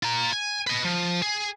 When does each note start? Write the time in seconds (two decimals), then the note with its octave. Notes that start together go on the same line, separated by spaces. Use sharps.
0.03 F4 A#5
0.32 G#5
0.67 B4 D#5
0.85 F3
1.22 G#4